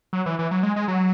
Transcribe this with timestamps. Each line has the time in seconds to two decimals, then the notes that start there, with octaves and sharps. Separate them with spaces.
0.13 F#3
0.26 E3
0.39 E3
0.51 F#3
0.63 G#3
0.76 G#3
0.88 F#3